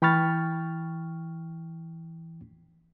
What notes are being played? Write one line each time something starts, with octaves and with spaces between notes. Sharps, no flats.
E3 G5 B5 C#6 F6 A6